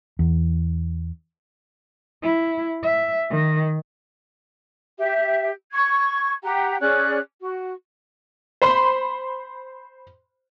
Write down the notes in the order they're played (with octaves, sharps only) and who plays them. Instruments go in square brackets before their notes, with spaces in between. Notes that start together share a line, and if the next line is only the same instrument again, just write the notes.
[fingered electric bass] E2
[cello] E4
E5
D#3
[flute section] G4 E5
C#6 G#6
G4 F#5 G5 A#5
C#4 G#4 D5 F#6
F#4
[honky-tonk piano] C5 B5 C6